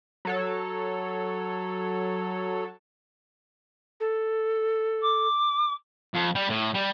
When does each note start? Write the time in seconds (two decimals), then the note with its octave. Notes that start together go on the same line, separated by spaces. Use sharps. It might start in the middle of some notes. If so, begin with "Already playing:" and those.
0.25 F#3 A4 C#5
4.00 A4
5.02 D6
6.14 F2
6.35 G3
6.49 A2
6.75 G3